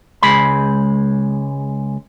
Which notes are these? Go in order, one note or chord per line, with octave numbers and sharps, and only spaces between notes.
C#2 G#3 B5